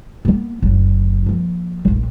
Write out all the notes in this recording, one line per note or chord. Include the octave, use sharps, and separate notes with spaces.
A#3 B3
F#1 D2
F3 A#3
F1 A#1